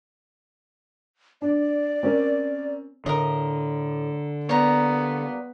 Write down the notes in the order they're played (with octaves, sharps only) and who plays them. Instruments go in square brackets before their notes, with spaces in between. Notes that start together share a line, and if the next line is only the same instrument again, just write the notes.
[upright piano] D4 [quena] D5
[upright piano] C4 C#4 A#4
[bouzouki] A2 [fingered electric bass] D3 [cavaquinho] A#4 D#5
[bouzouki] G3 A#3 [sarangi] B3 [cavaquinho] C#5 A#5